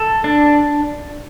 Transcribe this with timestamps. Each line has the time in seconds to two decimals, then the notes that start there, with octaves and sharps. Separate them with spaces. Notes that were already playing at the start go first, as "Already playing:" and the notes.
Already playing: A4
0.24 D4